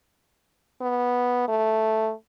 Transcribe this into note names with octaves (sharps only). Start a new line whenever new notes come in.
B3
A3